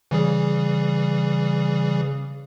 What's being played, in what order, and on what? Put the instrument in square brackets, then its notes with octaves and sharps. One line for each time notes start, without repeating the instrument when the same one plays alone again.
[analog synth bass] C#3 [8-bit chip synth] E3 G3 G#4